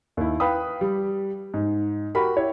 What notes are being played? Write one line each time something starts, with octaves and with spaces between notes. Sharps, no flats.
D#2 E4
B4 F5 G5 B5 D#6
G3
G#2
F#4 G4 A#4 B5
E4 G4 C#5